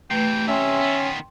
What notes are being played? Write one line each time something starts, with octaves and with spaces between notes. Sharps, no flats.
C3 E3 A3 B4 G5
C#4 E5 G5 C6
D#3 B3